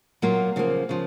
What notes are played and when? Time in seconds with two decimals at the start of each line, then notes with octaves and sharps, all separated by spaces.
0.22 A#2 F#3 A#3 F4
0.56 C#3 F3 A#3
0.89 C#3 F3